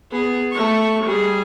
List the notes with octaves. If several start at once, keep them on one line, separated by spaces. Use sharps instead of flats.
B3 G#4
A3 C#6
G3 G#4